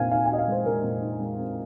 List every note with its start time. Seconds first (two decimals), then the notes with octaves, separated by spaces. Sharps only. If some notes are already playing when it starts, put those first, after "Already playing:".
Already playing: A#2 C4 D#4 F5 G#5
0.11 D#4 F5
0.25 G#5
0.30 D#4 D#5
0.38 F5
0.48 G#3 C5
0.66 G#3 A#4
0.84 A#2
1.02 D#4
1.20 G#3
1.38 C4